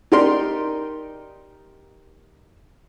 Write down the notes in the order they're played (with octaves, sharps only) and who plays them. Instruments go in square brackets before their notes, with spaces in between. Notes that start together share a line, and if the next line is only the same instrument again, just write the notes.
[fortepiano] D#4 G4 A#4 D5 C6